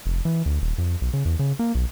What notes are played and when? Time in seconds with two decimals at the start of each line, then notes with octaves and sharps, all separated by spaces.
0.06 F1
0.25 E3
0.46 D2
0.62 D#1
0.78 F2
1.01 B1
1.13 C#3
1.25 E2
1.39 C#3
1.59 A#3
1.75 B1